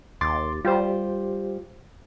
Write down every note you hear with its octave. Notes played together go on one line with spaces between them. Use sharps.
D#2 C6 D6 A6
G3 F4 G4 C5